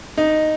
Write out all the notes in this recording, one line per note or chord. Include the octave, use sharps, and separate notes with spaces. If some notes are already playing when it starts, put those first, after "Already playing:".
D#4